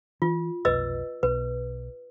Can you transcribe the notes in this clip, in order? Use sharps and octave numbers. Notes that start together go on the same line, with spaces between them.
E3 F4
F1 B1 B4 D#5 E6
B1 B4